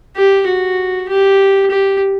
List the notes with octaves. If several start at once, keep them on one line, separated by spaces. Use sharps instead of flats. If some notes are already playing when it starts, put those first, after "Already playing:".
G4
F#4
G4
G4